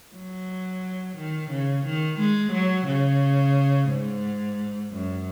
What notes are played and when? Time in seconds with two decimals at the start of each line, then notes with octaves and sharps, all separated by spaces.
0.15 F#3
1.17 D#3
1.51 C#3
1.85 D#3
2.19 G#3
2.53 F#3
2.87 C#3
3.90 G#2
4.91 F#2